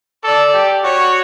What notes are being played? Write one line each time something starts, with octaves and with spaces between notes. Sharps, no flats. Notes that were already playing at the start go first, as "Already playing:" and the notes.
A4 D5
G4
F#4 C#5